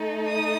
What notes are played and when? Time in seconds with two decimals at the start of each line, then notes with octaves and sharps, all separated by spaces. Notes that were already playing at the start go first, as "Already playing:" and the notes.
Already playing: A3 D#4 A4
0.26 D#6